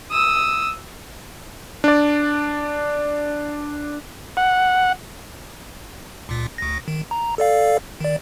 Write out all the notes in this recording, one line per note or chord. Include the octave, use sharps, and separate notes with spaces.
D#6 E6
D4 D5
F#5
C#2 A#2
D2 A#6
D#3
A#5
A4 D5 F5
D#3 D5